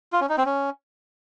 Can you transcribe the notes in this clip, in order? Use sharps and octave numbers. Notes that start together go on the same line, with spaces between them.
F4
C#4
D#4
C4
C#4